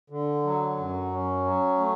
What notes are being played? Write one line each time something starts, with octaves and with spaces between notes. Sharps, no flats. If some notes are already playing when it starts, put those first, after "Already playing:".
D3
F#3
F#2
C#4
F#3
A3